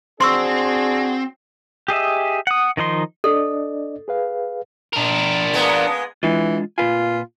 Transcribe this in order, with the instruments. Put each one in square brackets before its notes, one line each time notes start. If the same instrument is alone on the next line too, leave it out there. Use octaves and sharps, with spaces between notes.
[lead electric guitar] C4 [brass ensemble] D4 F#4 G#4 [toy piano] C6 C#6 E6
[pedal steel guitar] G4 G#4 D#5 E5
F#5 D#6
D#3 F3 D#4 C6
[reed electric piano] D4 D5 D#5 [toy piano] A4
[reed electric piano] G#4 B4 F5
[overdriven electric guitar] D4 A#4
[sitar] G#3 A#3 B3
[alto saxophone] E3 [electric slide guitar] G#3 D4 F4
[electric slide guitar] A#2 B4 G#5 [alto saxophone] F4